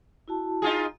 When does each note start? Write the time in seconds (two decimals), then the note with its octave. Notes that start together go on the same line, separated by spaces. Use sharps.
0.28 E4 F#4 A5
0.62 D#4 F4 G#4